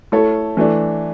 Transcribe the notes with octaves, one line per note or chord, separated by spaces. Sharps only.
A3 E4 A4 C#5
E3 A3 D4